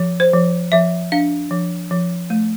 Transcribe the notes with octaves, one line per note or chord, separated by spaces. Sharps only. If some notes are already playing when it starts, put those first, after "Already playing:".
Already playing: F3
C5
F3
F3 E5
D4 F5
F3
F3
A3